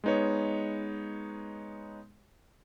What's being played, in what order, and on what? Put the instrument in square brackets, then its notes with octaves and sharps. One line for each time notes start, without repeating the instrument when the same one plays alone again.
[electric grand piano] G#3 B3 D#4 B4 C#5